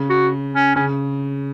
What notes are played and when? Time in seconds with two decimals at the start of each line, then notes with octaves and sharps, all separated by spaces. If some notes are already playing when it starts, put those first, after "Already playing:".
Already playing: C#3
0.10 F#4
0.54 C#4
0.76 C#3 C#4